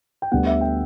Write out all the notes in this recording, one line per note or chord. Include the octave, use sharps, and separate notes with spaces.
G5
D2 D3 G3 B3 F#5
E5
G5